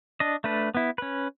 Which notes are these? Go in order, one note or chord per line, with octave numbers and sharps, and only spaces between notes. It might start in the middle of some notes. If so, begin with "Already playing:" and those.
D4 D#5
A3 D4 B4
B3 E4
C#4 B4